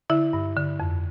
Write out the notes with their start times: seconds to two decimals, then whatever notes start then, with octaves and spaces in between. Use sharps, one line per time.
0.10 D3 E4 E5
0.33 G2
0.56 D3
0.80 F2